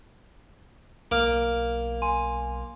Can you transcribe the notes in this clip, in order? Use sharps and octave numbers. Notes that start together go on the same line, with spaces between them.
B1 A#3 F5 F6 D7
G#5 C6 D#7